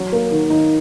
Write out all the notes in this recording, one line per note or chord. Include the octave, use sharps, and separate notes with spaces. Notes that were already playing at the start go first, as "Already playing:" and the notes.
Already playing: F#3
A#3
D#3
D#4